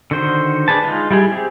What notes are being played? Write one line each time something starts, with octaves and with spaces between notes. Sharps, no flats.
D3 D#3 F#4 C5
D4 G#4 B4 A5
G#3 D#4 F4
G3 E4 G4 G#4
C4 G4 G#4